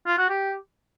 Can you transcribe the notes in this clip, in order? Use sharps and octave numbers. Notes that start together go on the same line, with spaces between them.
F4
F#4
G4